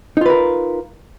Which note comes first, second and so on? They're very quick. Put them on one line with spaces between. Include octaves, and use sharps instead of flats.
D#4 F4 B4 A#4